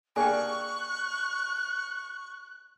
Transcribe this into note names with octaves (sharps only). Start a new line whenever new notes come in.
A#3 D4 G#4 G5 G#5 C#6 F#6